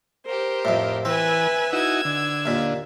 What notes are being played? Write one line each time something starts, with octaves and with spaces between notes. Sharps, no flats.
G4 A#4 C5
F2 A2
E3 C4 B4 E5 G#5
D#4 E4 F#4 E6 G#6
D3
D#2 A#2